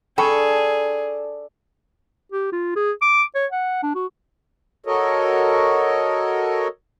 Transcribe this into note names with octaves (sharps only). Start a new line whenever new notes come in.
D4 G#4 A4 G5 B5 C#6
G4
F4
G#4
D6
C#5
F#5
D4
F#4
F#4 A4 A#4 C#5 D#5